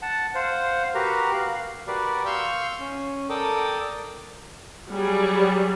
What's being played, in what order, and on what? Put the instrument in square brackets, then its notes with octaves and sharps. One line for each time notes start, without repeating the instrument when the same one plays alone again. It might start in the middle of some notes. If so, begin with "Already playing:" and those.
[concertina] F#5 A5
C5 F5 F#5
F#4 G4 A#4 B4 A#5
F5 F#6
[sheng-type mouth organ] F#4 G4 A#4 B4 D5
F5 C6 C#6 E6 G6
C#4
A4 A#4 D5 G5 A5 D#6
[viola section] F#3 G3 G#4